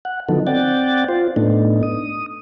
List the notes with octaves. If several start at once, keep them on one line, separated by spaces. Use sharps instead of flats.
F#5
D3 F3 F#3 B3 D#4 A4
C4 D5 F#5 G5 A6
F4 C5
A2 A3 B3 D4 D#4
D#6